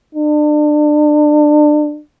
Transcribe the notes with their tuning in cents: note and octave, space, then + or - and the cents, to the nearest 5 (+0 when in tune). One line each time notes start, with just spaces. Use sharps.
D4 +30